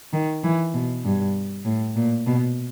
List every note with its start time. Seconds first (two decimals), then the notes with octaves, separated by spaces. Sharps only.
0.13 D#3
0.44 E3
0.74 B2
1.04 G2
1.65 A2
1.96 A#2
2.27 B2